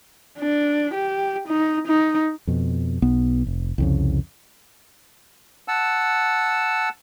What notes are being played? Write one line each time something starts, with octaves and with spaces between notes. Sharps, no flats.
D4
G4
D#4
D#4
F2 B2
B1 B3
F1
C2 F2 C#3
F#5 A5 E6